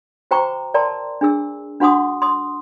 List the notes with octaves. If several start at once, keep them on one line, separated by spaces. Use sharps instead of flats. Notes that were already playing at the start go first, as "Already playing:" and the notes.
F#4 C5 G5 A#5 C#6 D6
A#4 D5 G5 A5 A#5 C6
D4 G#4 E6
D4 F#4 F#5 C6 D6 D#6
C6 D#6